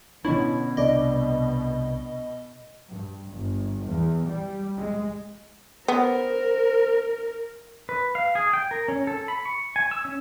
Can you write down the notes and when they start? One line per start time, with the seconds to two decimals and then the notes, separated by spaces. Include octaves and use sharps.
0.25 B2 D3 C#4 D4 E4 C#5 D#5
0.77 C2 D4 D5 D#5
2.90 G2
3.35 G1
3.88 E2
4.27 G3
4.77 G#3
5.88 B3 A#4 C5
7.89 B4
8.15 F5
8.35 G#4
8.53 G5
8.71 A#4
8.88 C#4
9.07 A4
9.28 B5
9.45 C#6
9.76 G#5
9.91 E6
10.05 C#4